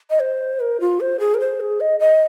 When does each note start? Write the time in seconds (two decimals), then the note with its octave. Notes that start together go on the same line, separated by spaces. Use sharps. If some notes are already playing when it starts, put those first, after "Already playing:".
0.10 D#5
0.21 C5
0.60 A#4
0.80 F4
1.00 C5
1.20 G#4
1.34 A#4
1.40 C5
1.60 G#4
1.80 D#5
2.00 D#5